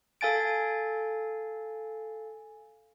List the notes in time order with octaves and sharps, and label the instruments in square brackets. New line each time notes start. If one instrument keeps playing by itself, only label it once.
[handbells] A4 F5 G#5 A6 D7